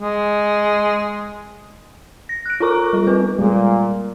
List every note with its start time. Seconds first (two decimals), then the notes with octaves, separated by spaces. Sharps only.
0.01 G#3
2.29 A#6
2.46 F#6 D7
2.60 F4 A4 A#4 A#5 C#6 D6
2.93 G3 F4
3.07 B3 C4 B4
3.39 A#2 G3 G#3